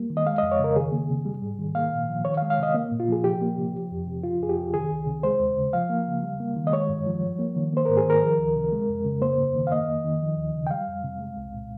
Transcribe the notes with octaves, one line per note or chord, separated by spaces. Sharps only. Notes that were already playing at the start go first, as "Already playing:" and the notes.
Already playing: G3 A#3
D#3
D#5
G#3 F5
D#5
F2
C#5
C#3 A#4
D#3 G#4
A#3
C3
G3
G#2
D#3
A#3 F5
A#2
F3
D#3 C#5
F5
G#3
F5
C3 D#5
A#3
A#2
F4
F3 G#4
F3 G4
A#3
C3
F3
F2
C3
F3 F4
F2 G#4
G4
C3
D#3 G#4
C#2
C3
G#3 C5
D#2
C#3
F3 F5
A#3
C#3
G3
A#3
D#3
D#5
G#3 C#5
G2
F3
G3
A#3
D#3
A#3 C5
G#2 A#4
G#4
D#3 A#4
F3
C#2
C3
G#3
F2
C#3
A#3 C5
G2
D#3
F5
A#3 D#5
F2
D#3
F3
D#2
C#3
G5
G3 F5
F2
C3
G#3
C2
A#2